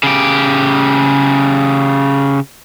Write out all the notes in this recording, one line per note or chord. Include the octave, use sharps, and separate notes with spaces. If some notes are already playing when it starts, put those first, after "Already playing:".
C#3 G4